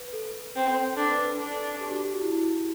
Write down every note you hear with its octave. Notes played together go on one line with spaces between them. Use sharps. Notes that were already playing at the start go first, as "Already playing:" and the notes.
Already playing: B4
A4
C4
D4 A4
B4
A4
D4
G4
F#4
G4
E4